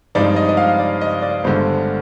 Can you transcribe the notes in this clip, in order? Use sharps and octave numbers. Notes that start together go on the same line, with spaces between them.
G2 F3 G#3 C4 D#4 D5
D#5
D#5
F5
D5
D#5
D5
G1 G2 D3 G#3 C5